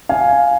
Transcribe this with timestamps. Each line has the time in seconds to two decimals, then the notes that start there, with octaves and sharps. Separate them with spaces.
0.09 F5 G#5